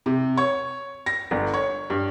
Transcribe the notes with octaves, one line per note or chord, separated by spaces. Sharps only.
C3
C#5
A#6
G1
C#5
G2